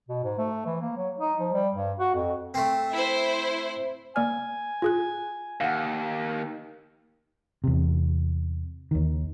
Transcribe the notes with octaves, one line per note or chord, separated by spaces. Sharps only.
B2
G#2
A3
E3
A#3
F#3
D#4
F3
G3
G2
F#4
F2
A3 C4
E4 C5
A#3 D5 G#5 F6
F4 G#4 F#6
D#2 F5 F#5
E2 C3
D#2 D#3